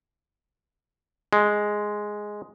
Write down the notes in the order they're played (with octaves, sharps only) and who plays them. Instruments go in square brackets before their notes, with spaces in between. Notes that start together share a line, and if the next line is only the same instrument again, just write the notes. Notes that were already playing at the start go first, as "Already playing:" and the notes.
[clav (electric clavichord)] G#3